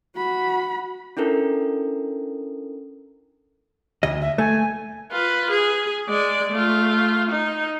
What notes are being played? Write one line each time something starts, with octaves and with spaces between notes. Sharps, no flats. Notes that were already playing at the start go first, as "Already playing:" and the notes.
F#4 B5
C#4 D4 E4 A4 A#4
D2 D#5
E5
A3 G#5
F4 B4
G#4
G#3 D5
A3 F4
D#4